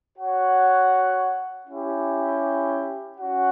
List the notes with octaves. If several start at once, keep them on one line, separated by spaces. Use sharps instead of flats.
F#4 C#5 F#5
C#4 E4 G4
C#4 F#4 C#5 F#5